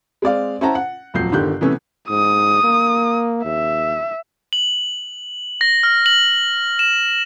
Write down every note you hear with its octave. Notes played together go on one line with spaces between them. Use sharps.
G#3 C4 D5 F5
C#4 E4 C5 F#5 A5 A#5
F#5
D#1 F2 F#3 G6 C7
G1 D3 D#3 G4 F#6 G6
C3 E3 A3 B3 C#4
G#2 D#6
A#3
D#2 E5
F#7
A#6
F6
F#7
E7